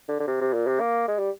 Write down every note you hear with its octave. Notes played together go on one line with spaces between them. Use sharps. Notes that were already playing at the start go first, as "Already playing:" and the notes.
D3
D3
C3
C3
A#2
C3
A#3
G#3
G3